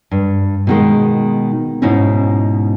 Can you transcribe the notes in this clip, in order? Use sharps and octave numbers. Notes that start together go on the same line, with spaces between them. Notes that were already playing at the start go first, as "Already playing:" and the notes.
G2
B2 D#3 G#3
G#2 B2 C#4 D#4 E4